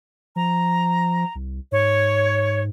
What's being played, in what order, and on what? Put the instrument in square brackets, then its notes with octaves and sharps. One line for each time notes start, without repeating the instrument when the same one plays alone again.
[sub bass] F3 [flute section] A#5
[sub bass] C2
[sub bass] G#2 [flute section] C#5